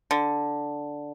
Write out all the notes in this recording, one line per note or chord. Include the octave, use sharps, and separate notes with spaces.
D3